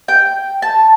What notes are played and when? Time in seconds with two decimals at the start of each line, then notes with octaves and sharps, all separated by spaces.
0.08 G5
0.62 A5